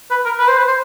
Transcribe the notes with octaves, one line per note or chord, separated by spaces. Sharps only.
B4
A#4
B4
C5
B4
C5